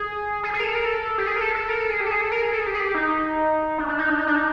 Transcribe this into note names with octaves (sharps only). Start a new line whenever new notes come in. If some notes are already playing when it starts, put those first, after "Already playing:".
Already playing: G#4
G#4
G#4
A#4
A4
A#4
A4
G4
G#4
A#4
A4
A4
A#4
A4
G#4
G4
A4
G#4
A4
A#4
G#4
A4
G#4
G4
G#4
G4
D#4
D4
D4
D#4
D4
D#4
D4
D#4